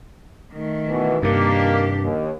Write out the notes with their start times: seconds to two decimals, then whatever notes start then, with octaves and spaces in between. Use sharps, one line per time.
0.52 D#3 A3
0.88 B2 E3
1.22 G2 C3 D#3 A#3 D4 G4
2.02 D#2